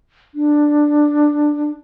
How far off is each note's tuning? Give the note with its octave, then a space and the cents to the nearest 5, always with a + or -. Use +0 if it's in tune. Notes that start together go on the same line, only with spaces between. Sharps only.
D4 +5